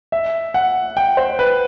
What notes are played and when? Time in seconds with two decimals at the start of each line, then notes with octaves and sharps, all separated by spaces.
0.12 E5
0.54 F#5
0.97 G5
1.17 C5
1.39 B4